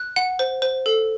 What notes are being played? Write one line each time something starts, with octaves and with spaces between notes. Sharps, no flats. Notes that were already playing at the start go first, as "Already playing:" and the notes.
Already playing: F#6
F#5
C5
C5
A4